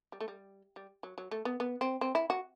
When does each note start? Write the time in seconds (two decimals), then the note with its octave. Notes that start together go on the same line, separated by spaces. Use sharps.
0.12 G3
0.21 A3
0.28 G3
0.76 G3
1.03 F#3
1.18 F#3
1.31 A3
1.45 B3
1.60 B3
1.81 C4
2.01 C4
2.15 E4
2.30 F#4